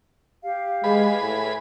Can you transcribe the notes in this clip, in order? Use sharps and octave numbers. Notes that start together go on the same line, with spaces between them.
G4 F5
G#3 G#4 B4 B5
A2